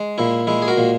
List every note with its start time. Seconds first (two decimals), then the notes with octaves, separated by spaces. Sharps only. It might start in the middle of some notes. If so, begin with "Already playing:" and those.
Already playing: G#3
0.18 A#2 E4
0.47 G#3 E4
0.62 G#4
0.68 F#4 A#4
0.78 A#2